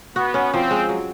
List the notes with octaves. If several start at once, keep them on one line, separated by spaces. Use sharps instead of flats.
B3 F#4
C#4
F3 C4
G#3
F#3